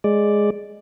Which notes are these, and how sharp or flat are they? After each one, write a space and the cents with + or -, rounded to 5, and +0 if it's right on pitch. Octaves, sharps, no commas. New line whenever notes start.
G#3 +0 D5 +0